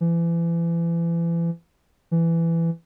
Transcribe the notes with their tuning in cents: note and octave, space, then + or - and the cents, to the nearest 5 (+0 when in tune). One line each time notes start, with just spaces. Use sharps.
E3 +35
E3 +15